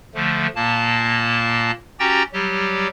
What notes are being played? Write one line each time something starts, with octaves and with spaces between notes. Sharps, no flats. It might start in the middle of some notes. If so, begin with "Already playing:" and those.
D3 F3 A3
A#2 A#3 A5
C#4 F#4 G4 G5 A#5 A6
F#3 G3 G4